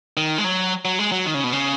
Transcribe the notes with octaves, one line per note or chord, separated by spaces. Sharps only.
D#3
G#3
F#3
F#3
G#3
F#3
D#3
C#3
B2
C#3